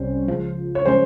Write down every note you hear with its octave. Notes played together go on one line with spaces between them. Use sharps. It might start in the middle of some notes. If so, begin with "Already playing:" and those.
Already playing: C2 C3 G3 C#4 C5
C#2 C#3 F3
C#5
C#3 F3 G#3 C#4 C5